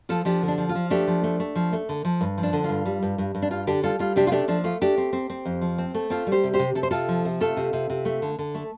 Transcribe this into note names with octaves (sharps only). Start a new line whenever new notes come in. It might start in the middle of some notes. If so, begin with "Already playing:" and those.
F3 F4 A4
F3 D4 G4
D3
D4
F3
F4
F3
A3 D4 G4
F3
A3
A3
F3
A3
D3
F3
G2
F3
D4
D3
G2 F4
G3
G2
G2
G2
D4
G3 F4
D3 D4 G4
G3 F4 A4
G3 F4
C3 D4 G4
F4
A3 D4 G4
F3 D4
A3 F4
A3 D4 G4
C4
C4
C4
F2
F3
C4
A3
C4 F4 A4
G3
G4 C5
C3
G4 C5
C3
C3 A4
C5
C3 F4 A4
F3
C3
A3 F4 A4
C3
C3
C3
A3
D3
D3
A3